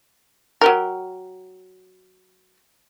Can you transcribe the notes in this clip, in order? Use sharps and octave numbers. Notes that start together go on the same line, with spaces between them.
F#3 G4 A#4